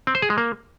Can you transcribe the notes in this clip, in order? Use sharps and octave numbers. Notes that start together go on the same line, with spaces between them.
C4
C5
G#4
G#3
A#3